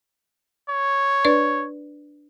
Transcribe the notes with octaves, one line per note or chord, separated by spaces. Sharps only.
C#5
D4 B4 D5